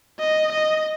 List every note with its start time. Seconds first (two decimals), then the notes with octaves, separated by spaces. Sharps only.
0.19 D#5
0.52 D#5